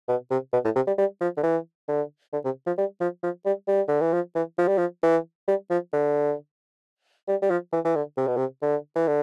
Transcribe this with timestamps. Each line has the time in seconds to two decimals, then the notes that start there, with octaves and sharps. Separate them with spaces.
0.09 B2
0.30 C3
0.53 B2
0.65 A2
0.76 C3
0.87 G3
0.98 G3
1.21 F3
1.37 D3
1.43 E3
1.88 D3
2.33 D3
2.45 C3
2.67 F3
2.78 G3
3.01 F3
3.23 F3
3.45 G3
3.68 G3
3.88 D3
4.01 E3
4.13 F3
4.35 E3
4.58 F3
4.68 G3
4.78 F3
5.03 E3
5.48 G3
5.70 F3
5.93 D3
7.28 G3
7.42 G3
7.50 F3
7.73 E3
7.85 E3
7.95 D3
8.17 C3
8.27 B2
8.37 C3
8.62 D3
8.96 E3
9.07 D3